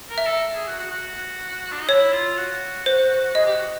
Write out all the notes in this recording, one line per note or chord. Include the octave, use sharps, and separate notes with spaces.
A#4
E5
A4
G#4
F#4
F#4
F#4
D4
D#4
E4 C#5
F4
F#4
C5
G#4 D#5
G4
F#4